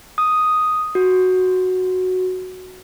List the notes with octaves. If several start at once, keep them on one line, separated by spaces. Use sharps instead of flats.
D#6
F#4